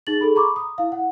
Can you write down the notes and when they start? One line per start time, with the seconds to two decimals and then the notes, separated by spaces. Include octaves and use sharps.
0.07 D#4 G#4 A6 F#7
0.21 G#4 A4 B5
0.35 A#5 B5 C#6 D6
0.56 D#6
0.78 E4 F5
0.92 F#5